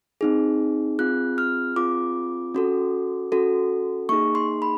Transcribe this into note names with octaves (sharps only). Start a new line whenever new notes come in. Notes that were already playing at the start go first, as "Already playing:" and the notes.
C4 D#4 G#4
C4 F4 G#4 F#6
F6
C4 F4 G#4 D6
C#4 F#4 A4
C#4 F#4 A4
A#3 D#4 G#4 C#6
C6
B5